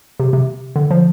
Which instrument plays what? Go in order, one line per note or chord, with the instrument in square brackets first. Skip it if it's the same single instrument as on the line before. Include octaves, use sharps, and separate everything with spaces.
[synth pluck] C3
C3
D3
F3